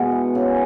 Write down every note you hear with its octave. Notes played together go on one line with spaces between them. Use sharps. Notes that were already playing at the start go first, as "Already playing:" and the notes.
Already playing: B2 G#3 B3 E5 F#5
E3
C#3